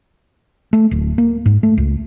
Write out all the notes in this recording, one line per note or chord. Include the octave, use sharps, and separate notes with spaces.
A3
D1
A#3
G#2
A3
C#2